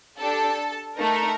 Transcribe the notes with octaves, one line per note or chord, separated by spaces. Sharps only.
D4 G4 A4 A5
A3 D#4 A4 A#4 A#5